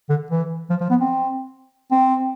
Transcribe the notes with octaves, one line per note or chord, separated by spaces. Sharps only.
D3
E3
F3
F3
B3
C4
C4